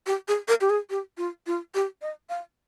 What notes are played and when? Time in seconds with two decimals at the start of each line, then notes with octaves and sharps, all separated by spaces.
0.07 G4
0.28 G#4
0.48 A#4
0.61 G4
0.70 G#4
0.90 G4
1.18 F4
1.47 F4
1.75 G4
2.02 D#5
2.29 F5